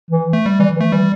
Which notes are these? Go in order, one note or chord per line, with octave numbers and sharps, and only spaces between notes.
E3
A3
G3
E3 G3
E3
A3
E3 G3